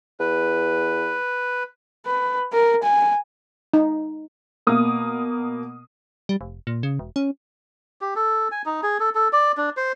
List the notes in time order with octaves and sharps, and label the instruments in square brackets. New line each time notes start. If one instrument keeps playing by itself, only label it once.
[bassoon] E2 [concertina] B4
[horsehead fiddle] B4
A#4
G#5
[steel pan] D#4
[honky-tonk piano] B2 A#3 D#6
[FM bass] G3
F1
A#2
C#3
E1
C#4
[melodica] G4
A4
G#5
D#4
G#4
A4
A4
D5
D4
C5